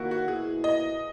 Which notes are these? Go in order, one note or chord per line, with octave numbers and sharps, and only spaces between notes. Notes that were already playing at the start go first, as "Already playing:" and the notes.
Already playing: D#2 D#3 A#3 E4 F#4
F#4
B2 A#3 E4 G#4
D#5